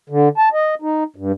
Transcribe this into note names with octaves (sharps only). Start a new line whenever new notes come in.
D3
A5
D#5
D#4
G2